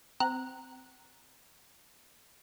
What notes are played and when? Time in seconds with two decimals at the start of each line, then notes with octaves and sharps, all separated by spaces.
0.20 C4 A#5 F#6